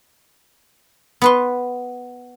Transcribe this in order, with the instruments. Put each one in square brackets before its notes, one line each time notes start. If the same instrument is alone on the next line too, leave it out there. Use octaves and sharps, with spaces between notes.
[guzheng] B3 B4 C6